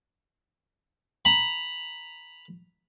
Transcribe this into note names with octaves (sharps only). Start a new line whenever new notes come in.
A#5 B5